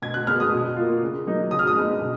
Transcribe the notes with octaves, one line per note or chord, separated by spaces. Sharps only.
B2 G#6
F#6
G#3 B3 F6
D#6
B2
A#3 F4
C#3
F#3 A#3 D#4
C#3 D#6
F6
D#6
G#3 B3 D#4
B2